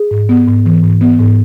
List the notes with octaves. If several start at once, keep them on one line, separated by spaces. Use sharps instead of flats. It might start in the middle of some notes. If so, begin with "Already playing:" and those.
Already playing: G#4
G#2
B3
G#2
E3
G#2
B3
G#2